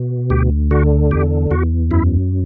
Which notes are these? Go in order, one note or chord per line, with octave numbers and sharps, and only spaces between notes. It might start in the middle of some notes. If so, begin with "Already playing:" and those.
Already playing: B2
D2 G4
D3 F#4
E2 G4
E2 F#4
F#2 E4